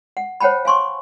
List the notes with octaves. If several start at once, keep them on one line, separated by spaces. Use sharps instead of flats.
F#5
C5 C#5 F#5 G5 A5 B5
F5 G#5 C6 C#6